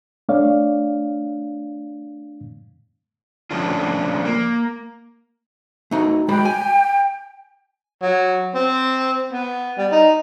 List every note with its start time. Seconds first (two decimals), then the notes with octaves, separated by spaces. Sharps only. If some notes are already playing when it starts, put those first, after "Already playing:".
0.29 A3 D4 C#5 D5 F5
3.51 F3 A3 C#4 D4 F4
4.25 A#3
5.91 A3 D#4 F#4
6.29 G#3 F#4 G5 B5
6.45 G#5
8.02 F#3
8.54 C4
9.32 B3
9.78 G3
9.91 D#4